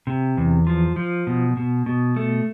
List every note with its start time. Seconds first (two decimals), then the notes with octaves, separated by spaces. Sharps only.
0.07 C3
0.37 E2
0.67 F3
0.96 F3
1.27 B2
1.57 B2
1.86 B2
2.16 A3